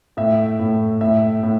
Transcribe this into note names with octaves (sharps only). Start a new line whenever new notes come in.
A2 E5
A2
A2 E5
A2